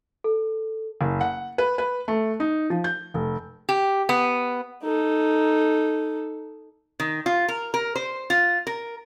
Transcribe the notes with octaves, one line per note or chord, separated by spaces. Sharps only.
A4
F#1
F#5
B4
B4
A3
D#4
F3
G6
F1
G4
B3
D#4 A4
D#3
F4
A#4
A#4
C5
F4
A#4